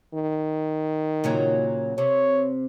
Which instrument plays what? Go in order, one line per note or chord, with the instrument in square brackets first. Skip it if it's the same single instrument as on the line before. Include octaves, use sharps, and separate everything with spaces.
[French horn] D#3
[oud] A#2 C#3 F#3
[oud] C3 [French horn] C#5